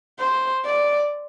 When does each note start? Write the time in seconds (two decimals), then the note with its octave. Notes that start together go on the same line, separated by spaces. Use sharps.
0.19 C5
0.64 D5